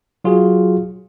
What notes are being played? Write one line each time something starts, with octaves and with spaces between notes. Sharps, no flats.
F#3 F4 F#4 G#4